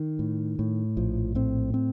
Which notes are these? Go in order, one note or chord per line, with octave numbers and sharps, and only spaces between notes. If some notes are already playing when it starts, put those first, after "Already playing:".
Already playing: D#3
A2
A2
A#1 F3
A2 C4
C4